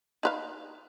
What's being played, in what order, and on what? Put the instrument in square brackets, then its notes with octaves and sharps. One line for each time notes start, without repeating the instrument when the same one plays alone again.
[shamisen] D#4 B4 F5